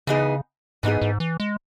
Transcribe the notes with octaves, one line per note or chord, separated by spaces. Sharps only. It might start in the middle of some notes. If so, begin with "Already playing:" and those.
C#3 E3 B3 D#4 G#4
G#2 E3 B3 D#4 G#4
G#2
E3
G#3